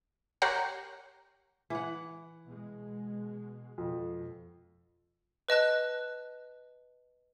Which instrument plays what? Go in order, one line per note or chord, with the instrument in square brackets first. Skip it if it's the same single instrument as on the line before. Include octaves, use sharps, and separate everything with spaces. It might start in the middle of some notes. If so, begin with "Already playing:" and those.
[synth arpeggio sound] G4 A#4 C#5 F#5 C6
[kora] E3 F#5
[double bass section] B2 G#3
[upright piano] F2 [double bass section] B2
[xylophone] B4 D#5 A5 F#6